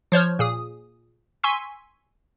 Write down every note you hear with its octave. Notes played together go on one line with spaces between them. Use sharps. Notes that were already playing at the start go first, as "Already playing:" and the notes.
F3 C5 C#5 F6
A#2 G#4 D#6
G#5 C6 C#6 E6 B6